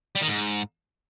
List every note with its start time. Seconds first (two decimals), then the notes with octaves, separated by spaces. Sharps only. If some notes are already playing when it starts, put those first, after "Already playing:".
0.16 G3
0.22 D#3
0.28 G#2